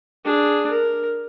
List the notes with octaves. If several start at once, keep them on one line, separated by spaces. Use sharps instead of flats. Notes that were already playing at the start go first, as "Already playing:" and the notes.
D4 G#4
A#4